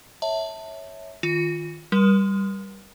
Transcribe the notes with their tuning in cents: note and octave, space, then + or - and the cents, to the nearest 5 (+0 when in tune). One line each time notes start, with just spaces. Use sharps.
C#5 +0 E5 -15 A5 +20
D#3 +0 F4 +0
G3 +0 A#4 +45